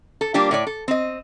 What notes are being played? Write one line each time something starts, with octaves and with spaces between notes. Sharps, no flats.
A4
G3 A#3 D4 F4 G4
A2 C#5 D5
A4
C4 D#5